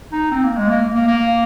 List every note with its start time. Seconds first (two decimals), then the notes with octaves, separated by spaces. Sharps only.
0.12 D#4
0.31 C4
0.44 A#3
0.57 G#3
0.69 A#3
0.94 A#3
1.07 A#3